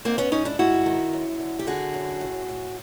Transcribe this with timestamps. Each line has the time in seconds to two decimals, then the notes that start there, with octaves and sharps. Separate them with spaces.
0.05 G#2 A#3 C4
0.18 B3 C#4
0.32 G#2 C#4 D#4
0.45 D4 E4
0.59 G#2 E4 F#4
0.86 D#3
1.13 F#2
1.40 D3
1.59 G4
1.67 D3 F#4 G#4
1.94 F#2
2.21 A2
2.48 A2